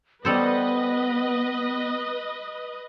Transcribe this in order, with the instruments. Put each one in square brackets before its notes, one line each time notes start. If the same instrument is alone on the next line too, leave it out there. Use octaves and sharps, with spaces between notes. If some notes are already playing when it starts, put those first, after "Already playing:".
[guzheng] G3 A4 C5 [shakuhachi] B3 [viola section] B4 D#5